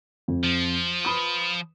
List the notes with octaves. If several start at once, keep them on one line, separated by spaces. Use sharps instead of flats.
F2
F3
B4 B5 D#6